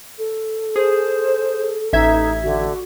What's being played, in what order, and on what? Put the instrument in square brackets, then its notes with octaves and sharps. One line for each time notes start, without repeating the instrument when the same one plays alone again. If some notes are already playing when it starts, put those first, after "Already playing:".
[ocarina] A4
[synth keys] G#4 [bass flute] C5
[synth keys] A1 E5 G#6 [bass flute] D#4
[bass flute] D3 [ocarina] F#4